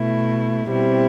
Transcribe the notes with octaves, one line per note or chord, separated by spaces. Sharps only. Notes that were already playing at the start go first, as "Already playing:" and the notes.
Already playing: B2 A3 E4
B2 G3 C4 E4